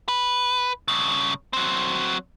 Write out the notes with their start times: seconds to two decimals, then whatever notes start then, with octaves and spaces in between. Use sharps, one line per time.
0.08 B4
0.88 G2 C#3
1.53 F#3 C4